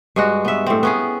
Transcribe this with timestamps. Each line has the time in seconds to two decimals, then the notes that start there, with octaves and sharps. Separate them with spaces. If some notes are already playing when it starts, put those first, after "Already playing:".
0.16 G2 G#3 F#4
0.45 B3 E5
0.66 A2 C4
0.83 B3 C#4 G#4